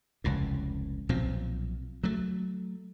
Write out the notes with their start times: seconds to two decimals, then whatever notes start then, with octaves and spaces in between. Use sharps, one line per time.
0.24 F1 C#2 A2
1.09 B1 A#2 F3 C4
2.04 F#3 A3